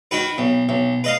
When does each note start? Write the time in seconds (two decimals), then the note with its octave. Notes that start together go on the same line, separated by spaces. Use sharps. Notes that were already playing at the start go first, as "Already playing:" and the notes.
0.11 D#3 F#4 B4
0.38 B1
0.69 B1
1.04 B4 D#5 F5